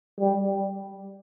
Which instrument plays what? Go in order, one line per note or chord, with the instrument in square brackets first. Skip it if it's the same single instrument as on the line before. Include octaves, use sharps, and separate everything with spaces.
[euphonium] G3